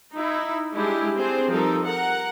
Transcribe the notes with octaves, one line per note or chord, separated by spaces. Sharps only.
D#4 E4
G3 G#3 D4 E4 G4 G#4
C4 D4 G#4 C5
F3 G3 D#4 A4 A#4
A#4 F#5